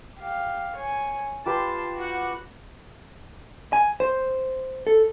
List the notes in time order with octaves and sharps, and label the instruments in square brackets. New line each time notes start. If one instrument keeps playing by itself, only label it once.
[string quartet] G4 F5
C#5 G#5
[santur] F4 G4 B4 [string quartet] A5 C6
[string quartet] F#4 F#5
[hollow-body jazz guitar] G#5
C5
A4